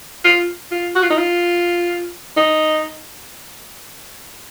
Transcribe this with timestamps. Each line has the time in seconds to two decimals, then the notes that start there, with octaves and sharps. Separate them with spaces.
0.24 F4
0.71 F4
0.95 F#4
1.03 F4
1.10 D#4
1.18 F4
2.37 D#4